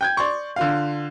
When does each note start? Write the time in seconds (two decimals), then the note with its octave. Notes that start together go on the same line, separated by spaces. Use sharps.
0.01 G5 G6 G#6
0.17 D5 C6 C#6
0.56 D3 F4 F5